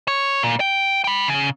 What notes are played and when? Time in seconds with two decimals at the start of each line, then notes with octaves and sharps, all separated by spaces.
0.08 C#5
0.43 A#2
0.60 G5
1.04 G5 B5
1.28 C#3